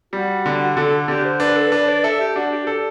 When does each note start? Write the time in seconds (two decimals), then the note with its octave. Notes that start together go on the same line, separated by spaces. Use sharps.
0.13 G3 F#4
0.46 D3
0.77 D3 A4
1.08 D3 G4
1.25 C5
1.40 D4 B4
1.57 A4
1.72 D4 B4
1.88 D5
2.03 A4 E5
2.20 G4
2.36 D4 F#4
2.51 G4
2.66 G4 A4